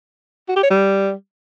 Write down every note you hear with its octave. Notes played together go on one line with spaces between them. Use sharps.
F#4
G4
C#5
G3